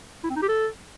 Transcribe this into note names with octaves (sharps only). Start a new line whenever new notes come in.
E4
C4
D#4
G4
A4